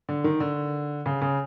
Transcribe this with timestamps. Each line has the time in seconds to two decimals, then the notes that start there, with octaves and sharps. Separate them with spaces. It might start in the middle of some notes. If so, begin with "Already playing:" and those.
0.09 D3
0.24 D#3
0.40 D3
1.06 C#3
1.22 C#3